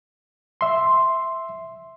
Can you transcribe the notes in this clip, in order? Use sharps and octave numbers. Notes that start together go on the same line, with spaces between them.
E5 C6